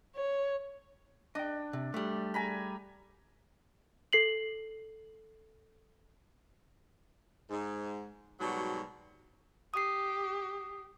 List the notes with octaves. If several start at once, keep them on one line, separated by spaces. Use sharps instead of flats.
C#5
D4 D#5 G5
C3
G3 A3
G#5 A#5 B5
A4 C7 F#7
G#2
G#2 B2 F#3 G3 F#4
G4 D#6 C7